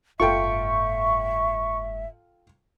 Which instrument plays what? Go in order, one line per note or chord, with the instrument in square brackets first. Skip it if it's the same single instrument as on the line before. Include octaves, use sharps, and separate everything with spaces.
[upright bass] F#1 G#2 [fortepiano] F4 A4 G5 [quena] E5 [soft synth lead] C#6